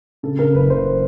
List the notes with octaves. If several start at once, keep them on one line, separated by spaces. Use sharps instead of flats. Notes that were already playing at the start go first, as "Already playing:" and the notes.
C#3 A4
C#3 A#4
F#1 B4
F#1 C5